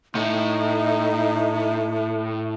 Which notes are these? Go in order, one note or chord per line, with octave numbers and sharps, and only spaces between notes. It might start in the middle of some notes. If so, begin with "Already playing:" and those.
A2 D#4 E5